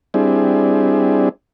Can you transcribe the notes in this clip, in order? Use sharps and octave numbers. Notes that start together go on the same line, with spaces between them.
G3 C4 D4 E4 G#4